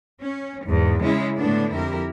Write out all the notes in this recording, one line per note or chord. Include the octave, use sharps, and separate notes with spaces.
C#4
E2 G#2
C#3 G#3 C#4 E4
A2 D3 A3 B3 D4
F2 E4 G4 A#4